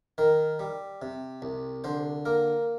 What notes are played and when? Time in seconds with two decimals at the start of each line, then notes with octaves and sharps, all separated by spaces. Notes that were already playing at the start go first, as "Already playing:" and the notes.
0.18 D#3 A#4
0.59 G3
1.02 C3
1.42 C2
1.84 D3 C5
2.25 A#3 A#4